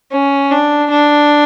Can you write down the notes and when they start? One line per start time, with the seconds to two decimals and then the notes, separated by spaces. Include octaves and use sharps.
0.12 C#4
0.51 D4
0.91 D4